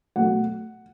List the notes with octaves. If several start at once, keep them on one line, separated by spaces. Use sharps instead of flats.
B2 F#3 A3 F#5